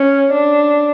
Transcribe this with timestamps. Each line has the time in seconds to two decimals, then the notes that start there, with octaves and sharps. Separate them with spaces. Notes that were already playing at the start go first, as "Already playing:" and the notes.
Already playing: C#4
0.33 D4